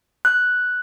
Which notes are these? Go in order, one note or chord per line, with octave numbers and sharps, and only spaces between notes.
F#6